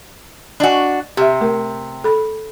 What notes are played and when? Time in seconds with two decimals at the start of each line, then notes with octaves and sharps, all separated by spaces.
0.60 D4 F#4 D5 D#5 G#5
1.17 C3 G4 E5
1.41 A3 A#4
2.04 A4 B5